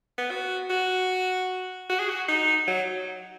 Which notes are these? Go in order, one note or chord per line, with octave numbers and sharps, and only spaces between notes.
B3
F#4
F#4
F#4
G#4
F#4
D#4
F#3